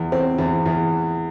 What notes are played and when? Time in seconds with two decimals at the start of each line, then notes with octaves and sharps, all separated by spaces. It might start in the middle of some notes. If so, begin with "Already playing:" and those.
Already playing: E2
0.12 C4
0.38 E2
0.66 E2